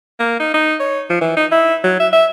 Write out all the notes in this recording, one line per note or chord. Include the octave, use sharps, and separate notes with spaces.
A#3
D#4
D#4
C#5
F3
E3
D#4
E4
F#3
E5
E5